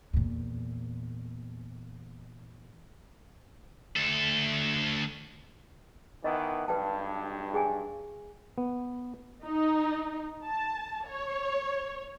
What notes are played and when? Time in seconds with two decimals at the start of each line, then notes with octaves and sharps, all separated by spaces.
0.13 E2 A#2
3.96 D2 A4
6.24 D#3 E3 B3 D#5
6.68 B1 G2 B4 G5 A5
7.54 G#4 G5 G#5
8.58 B3
9.44 D#4
10.43 A5
11.08 C#5